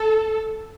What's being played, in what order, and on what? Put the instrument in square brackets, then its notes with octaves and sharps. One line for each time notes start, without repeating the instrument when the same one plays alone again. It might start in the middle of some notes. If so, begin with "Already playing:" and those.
Already playing: [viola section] A4